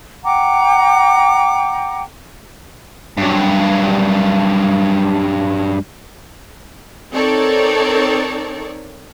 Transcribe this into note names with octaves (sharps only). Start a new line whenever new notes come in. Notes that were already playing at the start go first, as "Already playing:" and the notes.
F#5 G5 A#5 D6
G2 F#3
C4 D#4 A4 A#4 C#5 D5